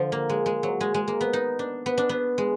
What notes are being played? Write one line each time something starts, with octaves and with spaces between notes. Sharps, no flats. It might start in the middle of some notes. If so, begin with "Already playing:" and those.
Already playing: D3 F3
A#3
G#3
G#3
F#3
G#3
G#3
A#3
B3
D#4
D4
B3
D4
B3
G#3